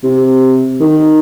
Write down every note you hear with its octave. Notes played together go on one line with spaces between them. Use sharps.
C3
D#3